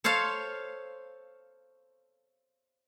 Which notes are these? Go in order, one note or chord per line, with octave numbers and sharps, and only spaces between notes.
A4 C5 C#5 F5 A5